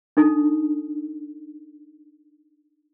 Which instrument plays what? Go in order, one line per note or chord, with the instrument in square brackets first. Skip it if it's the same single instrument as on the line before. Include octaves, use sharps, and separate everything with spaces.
[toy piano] D4 D#4 A4